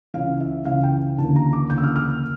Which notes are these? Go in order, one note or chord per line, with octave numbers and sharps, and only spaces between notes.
C#2 C#3 E3 F5
E5
C#2 C#3 E3 F5
G5
D2 C#3 E3 A#3 A5
A#5
D6
D2 C#3 E3 A#3 G6
E6
F6
F6